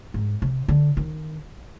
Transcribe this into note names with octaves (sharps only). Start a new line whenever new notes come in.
G#2
C3
D3
D#3